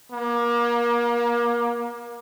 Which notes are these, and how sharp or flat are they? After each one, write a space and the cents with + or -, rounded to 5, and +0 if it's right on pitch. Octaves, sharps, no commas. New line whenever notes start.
A#3 +30